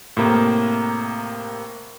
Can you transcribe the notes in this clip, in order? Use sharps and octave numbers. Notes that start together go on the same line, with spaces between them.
A2 C3 A#3